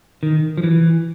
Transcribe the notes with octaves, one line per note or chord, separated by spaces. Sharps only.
D#3
F3
E3